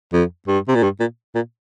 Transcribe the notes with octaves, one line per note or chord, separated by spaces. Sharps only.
F2
G2
C3
A#2
G2
A#2
A#2